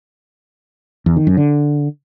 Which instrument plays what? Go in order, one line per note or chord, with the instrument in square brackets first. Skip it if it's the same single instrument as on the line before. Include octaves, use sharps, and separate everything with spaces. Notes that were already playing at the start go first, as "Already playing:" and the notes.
[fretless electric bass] E2
D#3
F#2
D3